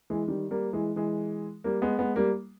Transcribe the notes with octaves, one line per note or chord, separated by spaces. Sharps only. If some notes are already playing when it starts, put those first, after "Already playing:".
E3 G#3
D#3 G3
G3 A#3
E3 G#3
E3 G#3
G3 A#3
G#3 B3
G#3 B3
G3 A#3